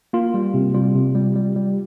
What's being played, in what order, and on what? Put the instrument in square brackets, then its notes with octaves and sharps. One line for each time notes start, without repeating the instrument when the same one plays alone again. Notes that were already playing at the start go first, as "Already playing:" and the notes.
[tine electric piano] A#3 F4
G3
C3
G3 F4
C3
G3
G3
G3